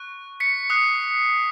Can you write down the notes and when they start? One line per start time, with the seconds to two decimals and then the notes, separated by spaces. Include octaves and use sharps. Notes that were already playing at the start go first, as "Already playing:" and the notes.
Already playing: C#6 F#6
0.40 B6 C#7
0.70 D#6 F#6 C7